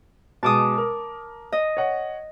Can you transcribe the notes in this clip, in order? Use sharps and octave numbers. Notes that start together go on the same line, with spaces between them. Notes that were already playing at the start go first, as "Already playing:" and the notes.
B2 G#3 A5 D6 D#6
A#4
D#5
C#5 F#5